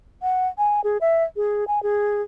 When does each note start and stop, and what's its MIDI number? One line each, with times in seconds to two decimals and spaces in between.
0.22 0.48 78
0.58 0.81 80
0.84 0.98 68
1.01 1.24 76
1.36 1.65 68
1.68 1.82 80
1.83 2.22 68